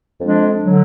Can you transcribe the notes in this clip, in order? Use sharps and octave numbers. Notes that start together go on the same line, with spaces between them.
F2 F3 G#3 D4
D3 F#3